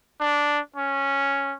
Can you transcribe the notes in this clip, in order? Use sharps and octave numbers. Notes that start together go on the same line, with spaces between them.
D4
C#4